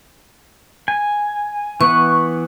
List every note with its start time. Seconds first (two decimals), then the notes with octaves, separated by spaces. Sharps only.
0.88 G#5
1.81 E3 B3 F#5 C#6